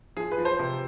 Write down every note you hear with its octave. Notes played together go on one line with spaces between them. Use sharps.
F3 G#4
B4
F3
C5
C3